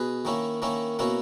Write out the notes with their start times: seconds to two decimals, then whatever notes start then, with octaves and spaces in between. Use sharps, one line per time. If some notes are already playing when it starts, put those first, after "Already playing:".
Already playing: B2 G#4 B4
0.25 D#3 A#3 C#4 E4
0.62 D#3 A#3 C#4 E4
0.99 B2 A#3 C#4 E4